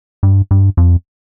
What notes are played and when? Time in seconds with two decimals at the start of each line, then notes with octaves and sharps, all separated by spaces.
0.23 G2
0.51 G2
0.77 F2